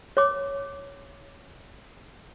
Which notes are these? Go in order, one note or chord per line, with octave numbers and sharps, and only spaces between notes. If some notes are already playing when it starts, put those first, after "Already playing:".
C#5 D6